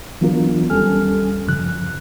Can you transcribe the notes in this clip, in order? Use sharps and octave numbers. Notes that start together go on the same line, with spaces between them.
E3 F#3 B3 D4 F4 A#4
D#2 G3 C#4 A4 G#5 F6
F#2 C#3 F3 F#6